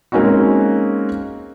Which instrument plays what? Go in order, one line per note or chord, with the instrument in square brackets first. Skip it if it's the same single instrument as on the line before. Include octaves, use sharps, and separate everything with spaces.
[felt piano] G#3 A#3 C4 C#4 D#4 F#4